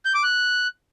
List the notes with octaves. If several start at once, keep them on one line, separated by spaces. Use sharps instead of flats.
G6
D6
F#6